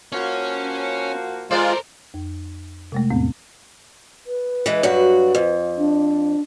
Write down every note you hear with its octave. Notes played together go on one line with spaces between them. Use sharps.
F3 A#3 C#4 F#4 C#5
G#3 F4 A4 A#4 C5 D5
F2
C3 G#3 A3
E2 A2 B3 C4
B4
E3 G#3
G2 F#3 F#4
F2
D4